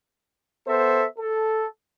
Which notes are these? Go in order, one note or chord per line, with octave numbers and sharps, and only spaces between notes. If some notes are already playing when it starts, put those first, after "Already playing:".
B3 A4 C5 E5
A4